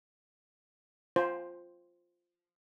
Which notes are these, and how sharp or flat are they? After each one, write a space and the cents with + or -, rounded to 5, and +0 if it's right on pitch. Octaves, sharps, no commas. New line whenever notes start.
F4 +0 C5 +5